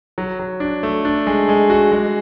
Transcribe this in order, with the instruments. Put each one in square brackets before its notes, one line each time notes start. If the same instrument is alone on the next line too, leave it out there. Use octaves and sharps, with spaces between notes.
[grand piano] F#3
F#3
D4
A3
D4
G#3
G#3
F#4
G#3